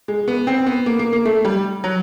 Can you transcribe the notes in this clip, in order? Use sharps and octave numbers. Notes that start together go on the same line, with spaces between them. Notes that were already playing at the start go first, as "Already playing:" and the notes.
G#3
B3
C4
B3
A#3
A#3
A#3
A3
G3
F#3